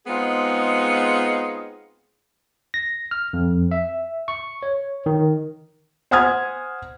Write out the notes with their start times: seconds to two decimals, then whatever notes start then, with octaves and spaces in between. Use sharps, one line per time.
0.06 G#3 B3 C4 D#4 F4 G#4
2.74 A#6
3.11 F6
3.33 F2
3.71 E5
4.28 C#6
4.63 C#5
5.06 D#3
6.11 C5 F#5 G#5 D#6 F6 G#6